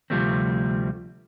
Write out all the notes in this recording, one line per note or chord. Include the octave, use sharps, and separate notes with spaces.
D2 C3 F3 G3 A3 C4